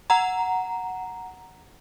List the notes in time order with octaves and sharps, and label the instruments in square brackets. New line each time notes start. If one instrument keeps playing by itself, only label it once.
[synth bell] F#5 A#5